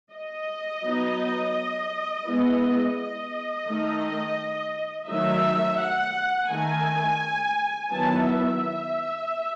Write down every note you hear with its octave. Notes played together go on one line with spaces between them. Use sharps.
D#5
F#3 B3 D#4
G#3 B3 E4
D#5
D#3 A3 D#4
D#3 F#3 A3 D#4 E5
F#5
D#3 A3 D#4 G#5
D#3 F#3 B3 E4 A5
E5